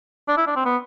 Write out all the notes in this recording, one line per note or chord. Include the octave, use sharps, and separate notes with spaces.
D4
E4
D4
C4
B3